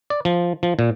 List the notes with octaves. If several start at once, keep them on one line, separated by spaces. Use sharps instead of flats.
D5
F3
F3
A#2